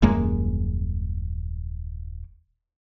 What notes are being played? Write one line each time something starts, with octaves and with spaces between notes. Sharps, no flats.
D#1 F#2 G#3 A#3